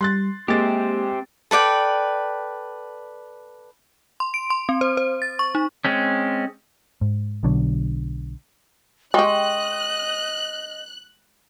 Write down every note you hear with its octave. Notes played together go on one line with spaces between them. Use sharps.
G3 C6 F#6 A6
G#3 A#3 C4 G4 A6
A4 B4 D5 G5
C6
D7
C6
C4
C5
C5
A6
C#6
D#4
G#3 C4 C#4
G#2
B1 B2 D3 F#3
G#3 G4 D#5 G5 C6 C#6 F#6